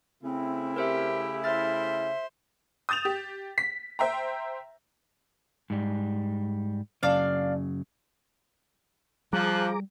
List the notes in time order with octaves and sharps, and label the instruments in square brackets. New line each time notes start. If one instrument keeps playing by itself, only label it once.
[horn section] C#3 A3 E4 [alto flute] C4
[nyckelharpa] G4 [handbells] A#4 C5 E5
[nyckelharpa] C5 [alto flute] E5 [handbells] F6 A6
[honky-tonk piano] D#6 G6 A6 E7 F7
G4
B6
C5 E5 G5 A#5
[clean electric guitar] G#2 G3
[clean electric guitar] F#2 C#3 [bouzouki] D4 D5 F5
[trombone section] F3 [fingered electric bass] G3 [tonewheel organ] G#4 A#5 D6 [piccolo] F#6